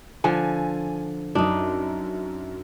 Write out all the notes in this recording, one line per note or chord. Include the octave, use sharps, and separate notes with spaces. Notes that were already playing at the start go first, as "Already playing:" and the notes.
D3 F3 G#5
F#2 D4 D#4